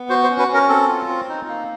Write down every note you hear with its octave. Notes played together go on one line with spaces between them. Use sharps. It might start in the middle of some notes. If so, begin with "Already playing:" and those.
Already playing: B3
F#4 C5
C5
C#4
B4
C#4
A#4
C4 A4
F4
C4
D#4
A#3